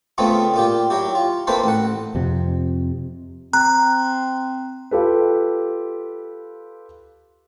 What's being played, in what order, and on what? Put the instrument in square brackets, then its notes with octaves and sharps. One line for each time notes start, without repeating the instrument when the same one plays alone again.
[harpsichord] C#3 A3 B3 C4 F4
A#2 F4 G4
F#3 E4 G4
F4
A#3 C4 E4 A4 B4 C5
A1 F#5
[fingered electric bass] F2 C3
[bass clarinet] C4 [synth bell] A#5 [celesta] F#6
[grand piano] F4 G4 A4 B4